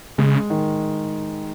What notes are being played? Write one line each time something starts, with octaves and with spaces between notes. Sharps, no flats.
C#3 G#3
D#3